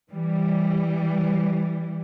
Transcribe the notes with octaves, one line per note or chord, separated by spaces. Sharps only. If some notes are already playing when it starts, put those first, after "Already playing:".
E3 G3